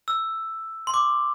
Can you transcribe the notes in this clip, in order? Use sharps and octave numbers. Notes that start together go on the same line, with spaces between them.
E6
C6
D6